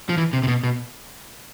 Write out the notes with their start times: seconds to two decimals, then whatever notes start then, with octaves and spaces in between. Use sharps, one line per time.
0.09 F3
0.18 E3
0.33 C3
0.44 C3
0.48 B2
0.64 B2